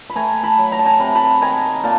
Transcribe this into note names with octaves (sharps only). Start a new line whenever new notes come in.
B5
A3 G#5 A#5
A5 B5
F#3
A#5
A5
G#5 A#5
C3 B5
A5 B5
D#3 G#5 A#5
A#2 A5